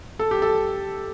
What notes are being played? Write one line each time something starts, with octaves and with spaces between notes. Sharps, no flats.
A4
G4
A4